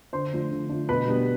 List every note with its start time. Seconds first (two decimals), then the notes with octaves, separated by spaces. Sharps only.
0.13 D3 C5 C6
0.33 F3 A3 D4
0.52 D3
0.70 F3 A3 D4
0.89 B2 B4 B5
1.08 G3 B3 D4